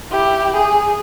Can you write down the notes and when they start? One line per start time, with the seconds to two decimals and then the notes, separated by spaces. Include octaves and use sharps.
0.11 E4 G4
0.55 G#4